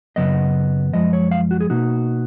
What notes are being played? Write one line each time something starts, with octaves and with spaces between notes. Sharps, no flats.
F#2 C#3 F#3 B3 D#5
F#2 F3 G#3 D#5
C#5
F5
F#4
G#4
B2 A#3 D#4 F#4